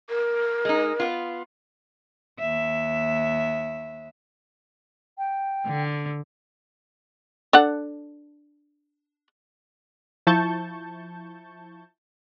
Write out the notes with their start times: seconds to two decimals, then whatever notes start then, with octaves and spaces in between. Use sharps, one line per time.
0.09 A#4
0.65 G#3 D#4
1.00 B3 F4
2.39 D#2 E5
5.18 G5
5.66 D3
7.53 D4 A4 F#5
10.27 F3 E4 A5 C#6 G6